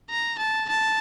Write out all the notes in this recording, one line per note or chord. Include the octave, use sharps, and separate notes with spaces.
A#5
A5
A5